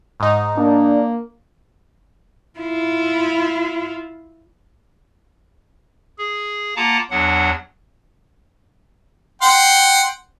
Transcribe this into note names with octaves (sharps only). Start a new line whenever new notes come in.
G#2 D#4
A#3 D4
E4 F4
G#4
A#3 F4 F#5 A5 A#5 D6
E2 F#3 D4 F#5
F#5 G5 C6